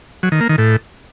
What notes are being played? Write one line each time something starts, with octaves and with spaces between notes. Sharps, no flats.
F#3
D#3
A#3
D#3
A2